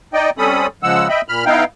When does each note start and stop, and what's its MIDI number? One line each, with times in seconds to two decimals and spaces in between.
0.14 0.30 63
0.14 0.30 74
0.14 0.30 75
0.14 0.30 79
0.38 0.67 55
0.38 0.67 60
0.38 0.67 61
0.38 0.67 69
0.38 0.67 83
0.38 0.67 87
0.83 1.08 49
0.83 1.08 53
0.83 1.08 56
0.83 1.08 78
0.83 1.08 88
1.09 1.21 75
1.09 1.21 76
1.09 1.21 79
1.09 1.21 83
1.28 1.45 46
1.28 1.45 83
1.28 1.45 89
1.46 1.64 59
1.46 1.64 63
1.46 1.64 64
1.46 1.64 77
1.46 1.64 79